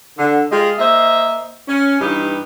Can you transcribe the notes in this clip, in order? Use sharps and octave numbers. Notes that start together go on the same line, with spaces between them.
D3
G#3 F4 G4 G#4 D#5
A#3 C5 D#5 E5
C#4
G2 E3 D#4 G4